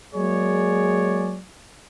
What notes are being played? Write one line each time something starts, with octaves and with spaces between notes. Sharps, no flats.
F#3 G#3 A#3 G#4 C#5 D5